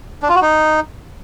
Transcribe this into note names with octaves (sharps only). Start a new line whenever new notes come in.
D4
F4
F#4
D#4